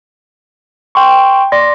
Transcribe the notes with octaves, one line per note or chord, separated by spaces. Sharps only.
G5 C6 C#6
D5 C6 A#6